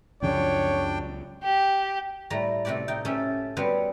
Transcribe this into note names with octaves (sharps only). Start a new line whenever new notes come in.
C#2 F#2 C#3 F3 F#3 D4 C#5 G5
G4
A2 G3 A3 A#5
C3 A3 F#4 G4 D5
D#4 G5
A3 C#4 G4 A4 E5
F#3 G3 B3 C4 F#4 C5